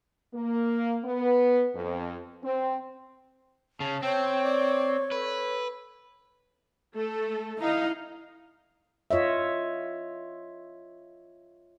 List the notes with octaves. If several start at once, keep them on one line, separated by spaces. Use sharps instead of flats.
A#3
B3
F2
C4
C#3 A5
C4 C#5 G5
D5
A4 B4
A3 A4
D#4 E4 F5
F4 C#5 D#5 E5